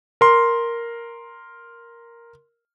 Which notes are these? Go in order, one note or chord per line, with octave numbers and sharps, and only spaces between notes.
A#4 C6